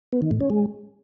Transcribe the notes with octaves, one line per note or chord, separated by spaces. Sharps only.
B3
D#3
A2
C#4
G#3